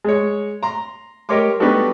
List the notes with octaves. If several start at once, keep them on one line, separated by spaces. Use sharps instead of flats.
G#3 C#5
A#5 C6
G4 A#4 C#5 D#5 C6 D6
G3 B3 D4 D#4 F#4 A4